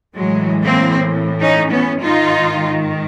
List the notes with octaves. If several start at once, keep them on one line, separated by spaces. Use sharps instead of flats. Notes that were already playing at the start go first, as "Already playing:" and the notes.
A2 E3 F#3 G#3
A#3 C4
C#4 D#4
B3 C#4
G#2 D#3 D#4 F4